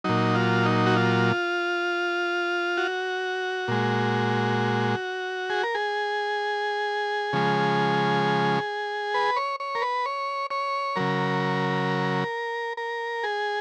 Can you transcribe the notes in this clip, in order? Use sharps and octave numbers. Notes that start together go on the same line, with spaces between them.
A#2 F#3 D#4
F4
D#4
F#4
F4
F#4
A#2 G#3
G#4
A#4
G#4
C#3 F3 G#3
B4
C#5
C#5
A#4
B4
C#5
C#5
C#3 F#3 A#4
A#4
G#4